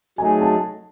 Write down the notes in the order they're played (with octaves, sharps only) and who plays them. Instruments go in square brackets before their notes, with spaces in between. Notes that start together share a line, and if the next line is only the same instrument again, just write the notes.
[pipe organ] F#3 A3 D#4 G#4 [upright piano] G#5
[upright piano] A5